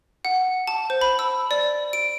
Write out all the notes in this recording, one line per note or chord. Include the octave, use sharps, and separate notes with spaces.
F#5
A5
C5
B5
E6
D5
D7